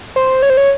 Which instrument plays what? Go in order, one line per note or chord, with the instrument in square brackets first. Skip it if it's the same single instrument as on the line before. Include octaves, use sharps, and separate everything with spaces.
[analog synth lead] C5
C#5
C5
C#5